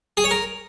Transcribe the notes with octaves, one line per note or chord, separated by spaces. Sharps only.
G#4
C#5
A#4